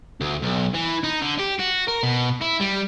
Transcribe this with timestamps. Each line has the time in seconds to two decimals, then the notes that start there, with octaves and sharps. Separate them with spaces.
0.21 D2
0.42 B1
0.74 E3
1.04 D#4
1.22 D3
1.39 G4
1.60 F#4
1.88 A#4
2.03 B2
2.41 E4
2.60 G3